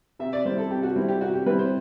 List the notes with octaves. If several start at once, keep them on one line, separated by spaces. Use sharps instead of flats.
C3 E5
D5
G3 C4 E4 C5
A4
C3 G4
F#4
G3 C4 E4
G4
C3 F#4
G4
G3 C4 E4 B4
C5